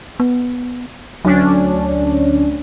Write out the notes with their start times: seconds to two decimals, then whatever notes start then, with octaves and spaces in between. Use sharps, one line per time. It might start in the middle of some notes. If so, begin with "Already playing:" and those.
0.20 B3
1.25 D2 F#3 C#4 D4